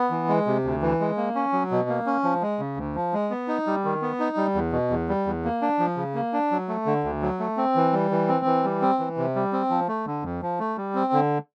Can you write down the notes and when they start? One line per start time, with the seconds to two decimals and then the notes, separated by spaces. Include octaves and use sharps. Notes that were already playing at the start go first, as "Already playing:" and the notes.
Already playing: B3
0.10 E3
0.29 G#3
0.47 C3
0.64 D2
0.82 E3
1.00 G#3
1.17 A#3
1.35 C#4
1.53 F#3
1.71 B2
1.89 A#3
2.06 C#4
2.23 F3
2.42 G#3
2.60 C#3
2.77 D2
2.95 F3
3.13 G#3
3.31 B3
3.48 D#4
3.67 G3
3.85 D#3
4.02 B3
4.20 D#4
4.37 G3
4.55 E2
4.72 B2
4.90 E2
5.09 G3
5.26 E2
5.45 A#3
5.62 D4
5.79 F3
5.97 C#3
6.15 A#3
6.33 D4
6.51 F#3
6.69 A3
6.86 D3
7.04 D2
7.22 F#3
7.40 A3
7.57 C4
7.76 E3
7.93 G3
8.11 E3
8.28 C4
8.45 E3
8.64 G3
8.82 C4
8.99 E3
9.17 C3
9.35 G3
9.53 C4
9.70 F3
9.88 A3
10.07 D3
10.23 F2
10.42 F3
10.60 A3
10.77 G3
10.95 C4
11.13 D3